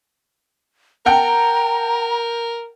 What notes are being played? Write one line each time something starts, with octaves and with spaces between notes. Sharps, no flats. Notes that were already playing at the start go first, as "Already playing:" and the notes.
A#4 F#5 G5 A5 A#5